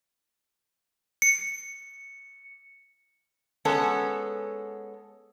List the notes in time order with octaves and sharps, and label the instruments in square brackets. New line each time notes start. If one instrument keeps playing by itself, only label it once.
[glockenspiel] C#7
[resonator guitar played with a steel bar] G#3 B3 C#4 A4